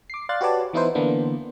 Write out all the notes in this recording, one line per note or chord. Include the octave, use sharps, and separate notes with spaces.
D6 C7
D5 F5 C6 F#6 A6
F#4 G4 B4 C#5 D5 A5
E3 B3 D#4 E4 B4 C5
D3 E3 A#3 B3 D4